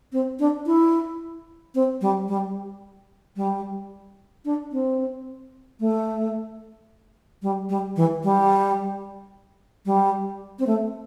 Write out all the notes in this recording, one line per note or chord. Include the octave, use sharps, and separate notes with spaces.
C4
D4
E4
C4
G3
G3
G3
D4
C4
A3
G3
G3
E3
G3
G3
C4
A3